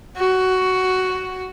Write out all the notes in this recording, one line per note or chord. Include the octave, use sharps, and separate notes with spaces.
F#4